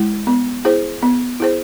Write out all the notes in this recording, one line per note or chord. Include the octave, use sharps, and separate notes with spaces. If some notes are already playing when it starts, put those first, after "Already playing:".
Already playing: G#3 E4
B3
E4 G#4 C5
B3
E4 G#4 C5